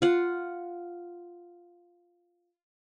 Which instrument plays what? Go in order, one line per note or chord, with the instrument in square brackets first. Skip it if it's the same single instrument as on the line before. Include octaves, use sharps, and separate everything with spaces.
[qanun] F4 F#5